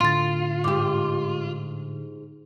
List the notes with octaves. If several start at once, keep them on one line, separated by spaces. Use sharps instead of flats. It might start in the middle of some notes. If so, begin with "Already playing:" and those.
A2 D3 F4 C6 A6
G#2 G4 D6